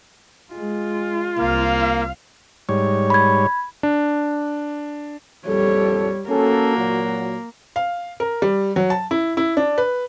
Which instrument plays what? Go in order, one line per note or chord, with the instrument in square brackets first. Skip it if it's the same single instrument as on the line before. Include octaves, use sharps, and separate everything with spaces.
[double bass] G#3 [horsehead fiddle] F4
[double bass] C2 [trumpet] A#3 [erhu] F5
[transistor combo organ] G#2 G3 C#5
[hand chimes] B5 G#6
[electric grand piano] D4
[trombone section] A#1 F2 A4 [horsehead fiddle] G3 C#5
[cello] A#3 [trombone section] C#4 A4 [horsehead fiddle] F#4
[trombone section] A#2 F#3
[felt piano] F5
A#4
G3
F#3
A5
E4
E4
D4
B4